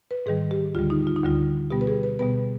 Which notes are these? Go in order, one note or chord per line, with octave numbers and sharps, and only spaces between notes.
B4
G#2 D#3 G3 G#4
G4
D2 D3 G3 F4
D#4
F4
D#4
D2 D3 G3 F4
B2 G3 B3 G4
B4
G#4
B4
B2 G3 B3 B4